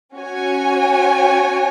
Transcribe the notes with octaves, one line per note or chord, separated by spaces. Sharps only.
C#4 F#4 C#5 G#5